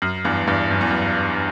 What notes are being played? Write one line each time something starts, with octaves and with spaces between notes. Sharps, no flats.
F#2
E2 G2
E2 G2
F#2
E2
F#2